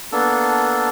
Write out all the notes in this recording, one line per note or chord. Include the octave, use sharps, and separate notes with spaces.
A#3 B3 D4 A4